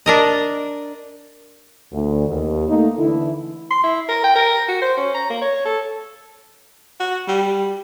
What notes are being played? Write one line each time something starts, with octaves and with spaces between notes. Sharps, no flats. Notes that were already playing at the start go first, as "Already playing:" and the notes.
D4 A#4 D#5
D2
D#2
A3 A#3 D#4
D3 E3 E4
C6
E4
A#4
G5
A#4
F#4
C5
C#4
A#5
A#3
C#5
A4
F#4
G3